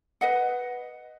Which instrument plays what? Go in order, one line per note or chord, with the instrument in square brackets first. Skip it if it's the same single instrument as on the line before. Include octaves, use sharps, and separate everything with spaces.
[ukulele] B4 D#5 F#5